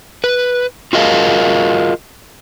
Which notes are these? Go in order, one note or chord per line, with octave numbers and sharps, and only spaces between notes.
B4
F4 F#4 G#4 A#4 D#5 F5